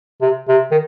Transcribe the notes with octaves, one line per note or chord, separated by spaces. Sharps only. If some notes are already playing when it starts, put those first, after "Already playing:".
C3
C3
D#3